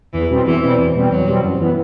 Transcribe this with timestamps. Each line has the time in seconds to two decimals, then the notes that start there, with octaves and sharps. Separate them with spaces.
0.13 E2 E3
0.30 B2 G3 C4
0.46 E2 E3
0.63 B2 G3 C4
0.78 E2
0.95 B2 G3 C4
1.10 E2 F#3
1.28 B2 G3 C4
1.43 F#2
1.59 E3 B3 E4